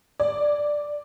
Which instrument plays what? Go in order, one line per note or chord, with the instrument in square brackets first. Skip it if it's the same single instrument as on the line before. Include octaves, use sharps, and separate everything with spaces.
[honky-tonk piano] D5